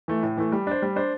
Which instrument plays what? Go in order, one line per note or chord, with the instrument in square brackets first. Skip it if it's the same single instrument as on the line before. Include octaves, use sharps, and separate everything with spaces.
[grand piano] E3 A3
A2
E3 A3
G3
D4 C5
G3
D4 C5